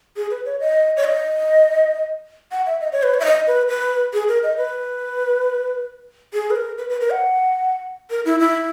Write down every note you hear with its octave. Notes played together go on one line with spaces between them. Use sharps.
G#4
B4
C#5
D#5
C#5
D#5
F#5
E5
D#5
C#5
B4
C#5
E5
D#5
B4
B4
G#4
A#4
D#5
B4
G#4
B4
A#4
B4
B4
A#4
F#5
A#4
E4
E4